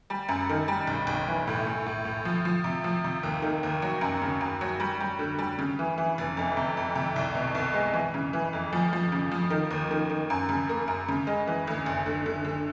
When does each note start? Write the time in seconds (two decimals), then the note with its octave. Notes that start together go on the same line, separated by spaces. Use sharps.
0.10 G3
0.29 F#2
0.49 D#3
0.68 G3
0.87 B1
1.07 B1
1.28 E3
1.47 A2
1.67 A2
1.86 A2
2.05 A2
2.25 F3
2.45 F3
2.64 C3
2.84 F3
3.04 C3
3.23 D#2
3.42 D#3
3.63 D#2
3.82 F#3
4.01 F#2
4.22 C#3
4.41 F#2
4.61 F#3
4.80 G3
5.00 G3
5.19 D3
5.39 G3
5.59 C#3
5.79 E3
5.98 E3
6.18 F1
6.37 F2
6.57 C3
6.77 F2
6.95 C3
7.16 C2
7.35 B2
7.55 C2
7.74 G#3
7.94 E3
8.14 C#3
8.33 E3
8.53 F2
8.73 F3
8.93 F3
9.12 C#3
9.32 F3
9.50 D#3
9.71 D#2
9.91 D#3
10.10 D#3
10.30 F#2
10.49 C#3
10.69 A#3
10.88 F#2
11.09 C#3
11.27 G#3
11.47 E3
11.67 D2
11.86 F#1
12.06 D3
12.26 D3
12.45 D3